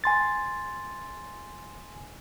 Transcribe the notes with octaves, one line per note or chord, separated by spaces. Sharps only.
G#5 C6 A6